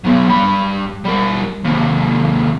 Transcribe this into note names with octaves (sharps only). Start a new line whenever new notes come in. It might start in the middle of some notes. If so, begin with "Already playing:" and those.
F#3 B3
G2 B5
G3 A#4
D#2 C3